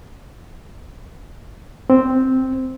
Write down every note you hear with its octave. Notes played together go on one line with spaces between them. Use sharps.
C4